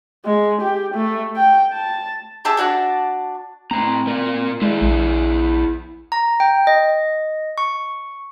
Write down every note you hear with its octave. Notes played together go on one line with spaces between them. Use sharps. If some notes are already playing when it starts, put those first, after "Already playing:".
G#3
G4
A3
G5
A5
G4 G#4 E5 A5
D4 F#4 D5 A5
A2 C4 A#5
A#2 A#4 D5
G#3 E4 G#4 D5
A#1
A#5
G5
D#5
C#6